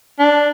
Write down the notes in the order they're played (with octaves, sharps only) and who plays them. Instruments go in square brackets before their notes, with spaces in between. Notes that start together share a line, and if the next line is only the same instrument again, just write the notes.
[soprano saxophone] D4